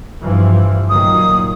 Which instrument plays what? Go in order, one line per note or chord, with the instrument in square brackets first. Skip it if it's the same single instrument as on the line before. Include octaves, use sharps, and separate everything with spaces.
[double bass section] G2 E3 F3
[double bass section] A#2 D#3 F#3 [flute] D#6